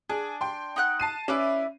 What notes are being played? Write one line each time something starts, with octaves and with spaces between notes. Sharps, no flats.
D4 G#4
G5 C6
D#4 F#5 F#6
A5 C7 D#7
C#4 E4 B4 D5